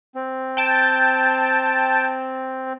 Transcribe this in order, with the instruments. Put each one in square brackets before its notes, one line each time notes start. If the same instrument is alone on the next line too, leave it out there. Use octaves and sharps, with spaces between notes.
[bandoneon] C4
[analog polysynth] G5 A5